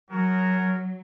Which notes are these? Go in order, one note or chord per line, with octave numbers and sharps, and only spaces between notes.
F#3 F#4 G#4 A#4